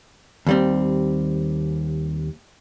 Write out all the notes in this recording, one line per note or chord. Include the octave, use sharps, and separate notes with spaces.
D#2 G3 C4